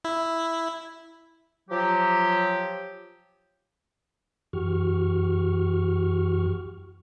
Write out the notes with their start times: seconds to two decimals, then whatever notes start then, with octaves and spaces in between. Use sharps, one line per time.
0.05 E4
1.70 F3 F#3 G4
4.53 F#2 E3 F#4 G4 C#6 F6